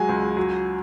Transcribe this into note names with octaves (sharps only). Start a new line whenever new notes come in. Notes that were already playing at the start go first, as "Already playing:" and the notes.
Already playing: F#3 G#3 G#5
C#2
F#3